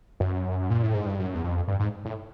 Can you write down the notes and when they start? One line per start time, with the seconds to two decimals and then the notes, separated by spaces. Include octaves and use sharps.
0.20 F#2
0.70 A#2
0.83 A2
0.94 G#2
1.06 G2
1.19 F#2
1.35 E2
1.44 F2
1.68 G2
1.80 G#2
2.05 A2